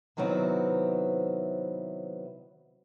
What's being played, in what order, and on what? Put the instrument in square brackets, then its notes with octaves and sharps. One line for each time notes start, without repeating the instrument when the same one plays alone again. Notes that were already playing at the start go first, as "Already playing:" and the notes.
[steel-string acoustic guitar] C3 D#3 F#3 B3 C4 E4